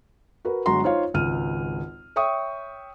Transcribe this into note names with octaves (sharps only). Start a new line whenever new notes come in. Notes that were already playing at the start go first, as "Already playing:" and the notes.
F#4 A#4 B4
G1 F#3 G#3 F#4 A#5 C6
D#4 F4 C5 C#5 F5
G#1 C#2 F6 D#7
C#5 E5 G5 C#6 D#6